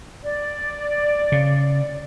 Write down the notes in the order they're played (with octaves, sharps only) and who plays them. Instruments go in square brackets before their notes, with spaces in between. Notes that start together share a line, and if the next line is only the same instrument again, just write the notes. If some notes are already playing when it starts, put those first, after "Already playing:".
[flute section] D5
[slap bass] C#3